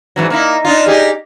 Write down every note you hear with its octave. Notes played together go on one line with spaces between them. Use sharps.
G#2 E3 F#3
A#3 D#4 E4
D4 D#4 F4
D#4 G4 G#4